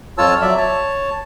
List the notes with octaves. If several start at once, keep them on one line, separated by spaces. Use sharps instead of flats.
F2 F4 C#5 A5 E6
F#3 D5 E5
C#5 A5